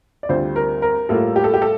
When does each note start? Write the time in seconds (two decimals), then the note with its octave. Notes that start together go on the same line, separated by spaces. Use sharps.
0.23 D5
0.29 D2 C3 G3 C4 F4 C5
0.56 A#4
0.82 A#4
1.09 A2 G3 A#3 F4 A4
1.36 G4
1.44 A4
1.54 G4
1.62 A4